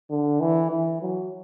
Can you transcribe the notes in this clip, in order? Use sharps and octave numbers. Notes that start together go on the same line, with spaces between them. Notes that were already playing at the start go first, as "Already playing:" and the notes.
D3
E3
E3
F#3